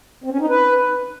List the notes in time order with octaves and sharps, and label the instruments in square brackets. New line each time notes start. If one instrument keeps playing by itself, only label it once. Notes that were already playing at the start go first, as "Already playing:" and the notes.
[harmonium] C4
C#4
D#4
B4